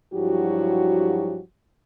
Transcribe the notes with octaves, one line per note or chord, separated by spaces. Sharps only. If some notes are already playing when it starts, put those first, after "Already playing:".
G2 F3 F#3 E4 F#4 G4